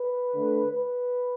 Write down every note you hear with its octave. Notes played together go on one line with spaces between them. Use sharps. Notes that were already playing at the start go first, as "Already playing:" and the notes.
Already playing: B4
D3 A3
B4